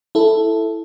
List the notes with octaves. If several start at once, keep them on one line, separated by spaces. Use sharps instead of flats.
E4 A4